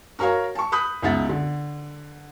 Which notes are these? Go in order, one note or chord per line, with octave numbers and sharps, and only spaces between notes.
F#4 A#4 C#5 F5 A#5
A5 C#6
B5 D#6 F#6 G6
C#2 B2 D#4 E5 F#5 A6
D3